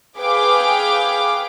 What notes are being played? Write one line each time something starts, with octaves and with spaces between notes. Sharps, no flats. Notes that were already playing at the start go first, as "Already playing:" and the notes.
G#4 B4 F5 G5 D6